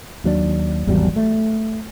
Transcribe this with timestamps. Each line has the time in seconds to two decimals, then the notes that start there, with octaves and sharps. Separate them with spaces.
0.24 D#2 F#3 A3 D4
0.87 G#1 E2 F#3 G3
1.16 A3